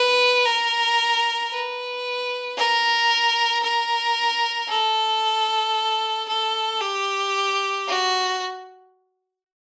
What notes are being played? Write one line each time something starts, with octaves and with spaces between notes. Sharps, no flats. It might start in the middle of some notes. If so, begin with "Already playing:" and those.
Already playing: B4
A#4
B4
A#4
A#4
A4
A4
G4
F#4